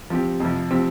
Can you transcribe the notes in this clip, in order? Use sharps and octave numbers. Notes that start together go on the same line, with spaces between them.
F3 C4 G4
F2 C3 F3
F3 C4 G4